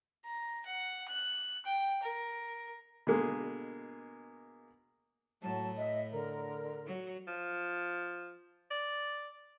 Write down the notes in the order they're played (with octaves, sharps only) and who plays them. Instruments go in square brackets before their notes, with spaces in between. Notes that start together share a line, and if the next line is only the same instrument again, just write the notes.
[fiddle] A#5
F#5
F#6
G5
A#4
[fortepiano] B2 D3 G#3 A#3
[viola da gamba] A2 [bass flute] F#3 [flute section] A5
[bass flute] D#5 [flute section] E5
[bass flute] D3 [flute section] A#4
[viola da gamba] F#3
[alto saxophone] F3
D5